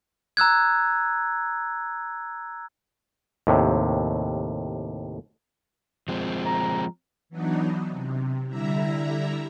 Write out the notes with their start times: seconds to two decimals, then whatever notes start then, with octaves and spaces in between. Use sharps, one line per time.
0.37 A#5 E6 F#6 G#6
3.47 D#2 A2 C3
6.08 F3 G#3 C4
6.46 A#5
7.29 E3 F#3 B3 D4 D#4
7.90 C3
8.48 D3 G3 E4 E5 A#5